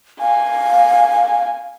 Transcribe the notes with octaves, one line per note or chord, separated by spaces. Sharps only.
F5 G#5